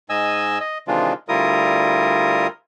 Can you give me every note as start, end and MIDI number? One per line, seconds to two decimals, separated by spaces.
0.10 0.59 44
0.10 0.59 75
0.10 0.59 80
0.10 0.59 88
0.60 0.78 75
0.88 1.13 48
0.88 1.13 51
0.88 1.13 52
0.88 1.13 56
0.88 1.13 62
0.88 1.13 65
1.29 2.47 38
1.29 2.47 55
1.29 2.47 64
1.29 2.47 65
1.29 2.47 70
1.29 2.47 87